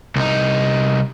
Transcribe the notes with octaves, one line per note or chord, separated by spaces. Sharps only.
C2 D#4